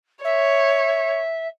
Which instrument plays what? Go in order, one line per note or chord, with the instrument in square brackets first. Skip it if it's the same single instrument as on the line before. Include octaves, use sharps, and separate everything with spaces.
[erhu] C#5 [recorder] E5